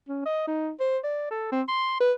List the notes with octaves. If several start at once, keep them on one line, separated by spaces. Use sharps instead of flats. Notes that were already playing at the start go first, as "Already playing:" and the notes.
C#4
D#5
D#4
C5
D5
A4
C4
C6
B4